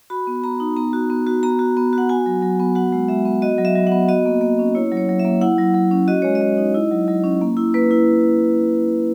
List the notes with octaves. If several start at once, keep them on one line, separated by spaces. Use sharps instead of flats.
F#4 B5
B3
B3 A#5
D#4
B3 A#5
F#4
B3
F#4
B3 A#5
F#4
B3
F#4 F#5
F#4 G#5
F#3
F#3
B3
F#4 F#5
G#3
G#3 E5
B3
F#4 D#5
F#3
E5
F#3
F#5
B3
F#4 D#5
A#3
A#3
C#4
E4 C#5
F#3
C#5
F#3
E5
A#3
E4 F#5
F#3
F#3
C#4
F#4 D#5
G#3 C#5
D#5
G#3
D#4
E4
F#3
F#3
C#4
A#3
E4
A#3 B4
E4